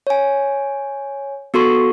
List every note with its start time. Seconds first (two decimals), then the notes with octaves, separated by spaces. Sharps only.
0.07 C#5 G#5
1.54 B3 F#4 A4 C6 C#6